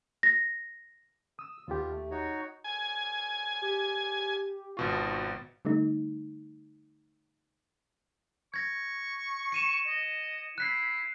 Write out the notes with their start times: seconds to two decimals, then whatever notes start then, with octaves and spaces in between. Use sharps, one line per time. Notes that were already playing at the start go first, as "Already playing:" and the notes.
0.23 A#6
1.39 D#6 E6
1.68 D#2 B2 B3 F4 G4
1.91 A3
2.11 D#4 F#4 C#5
2.64 G#5
3.62 G4
4.77 G#1 B2 F4 C#6
5.65 D3 G3 A3 D#4
8.54 C#6 G#6 A#6
9.52 C#7 D#7 E7
9.87 D#5
10.58 E4 F#6 B6 C7